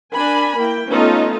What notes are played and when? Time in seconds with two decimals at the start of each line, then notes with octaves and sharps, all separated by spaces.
0.14 D4 A#4 G#5 B5
0.58 A#3 E4 G5
0.88 A3 B3 C#4 D#4 F4 A4